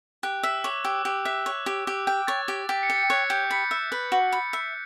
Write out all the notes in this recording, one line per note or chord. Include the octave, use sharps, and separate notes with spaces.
G4 F#6
E5 E6
C#5 D6
G4 E6
G4
E5 F#6
C#5
G4
G4
G5
C#5 A6
G4
G4 B6
C#7
G5
C#7
C#5 F#6
G4 G6
B5 C#7
E5
B4
F#4
B5
E5